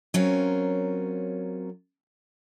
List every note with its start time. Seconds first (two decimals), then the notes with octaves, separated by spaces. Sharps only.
0.14 F#3 C4 C#4 F4 A#4